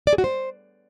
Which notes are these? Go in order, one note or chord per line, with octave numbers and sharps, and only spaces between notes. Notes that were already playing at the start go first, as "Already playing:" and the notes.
D5
G#4
F#4
C5